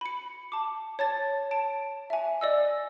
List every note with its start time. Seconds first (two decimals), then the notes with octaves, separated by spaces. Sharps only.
0.01 B5 C#7
0.52 A5 D6
0.99 C#5 A5 A6
1.51 A5 D7
2.10 E5 G#5
2.41 D5 D#5 E6